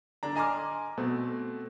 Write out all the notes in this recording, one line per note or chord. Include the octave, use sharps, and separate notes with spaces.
D3 D4 A#5
D#5 G#5 A#5 C6 D6 F6
B2 A3 C4